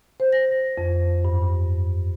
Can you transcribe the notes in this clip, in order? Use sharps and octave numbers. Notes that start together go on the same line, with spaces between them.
C5
A#6
F2
G2